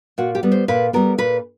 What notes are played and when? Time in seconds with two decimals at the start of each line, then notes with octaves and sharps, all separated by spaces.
0.18 A#2 F#4
0.35 G4
0.43 G3 B3
0.52 C5
0.68 A#2 B4
0.93 G3 B3 A#4
1.18 A#2 B4